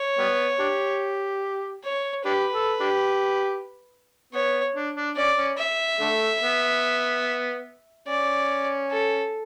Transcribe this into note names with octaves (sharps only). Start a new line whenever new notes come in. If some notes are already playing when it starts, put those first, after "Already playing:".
Already playing: C#5
G3 B3
D4 G4
C#5
D4 G4 B4
A4
D4 G4
B3 C#5
D4
D4
C#4 D5
C#4
E5
D3 A3
B3
C#4 D5
A4